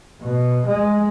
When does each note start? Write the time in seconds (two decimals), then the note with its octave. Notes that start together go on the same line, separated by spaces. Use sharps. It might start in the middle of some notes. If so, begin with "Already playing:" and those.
0.21 B2
0.66 G#3